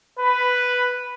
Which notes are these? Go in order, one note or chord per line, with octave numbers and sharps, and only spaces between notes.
B4